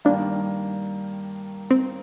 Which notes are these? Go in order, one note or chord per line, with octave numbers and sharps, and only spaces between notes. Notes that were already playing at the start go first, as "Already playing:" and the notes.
G2 D#3 A#3 D4
C4